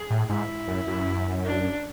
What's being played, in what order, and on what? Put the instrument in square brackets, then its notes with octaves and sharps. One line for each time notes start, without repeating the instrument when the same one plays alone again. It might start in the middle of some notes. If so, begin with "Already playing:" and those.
Already playing: [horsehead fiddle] G#4
[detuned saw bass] A2
[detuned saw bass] G#2 [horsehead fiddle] E4
[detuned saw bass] F#2
F#2
[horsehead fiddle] D4